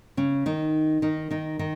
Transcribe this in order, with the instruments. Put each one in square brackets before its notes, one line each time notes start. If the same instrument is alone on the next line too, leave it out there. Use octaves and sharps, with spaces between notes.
[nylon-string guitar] C#3 C#4
D#3 D#4
D#3 D#4
D#3 D#4
D#3 D#4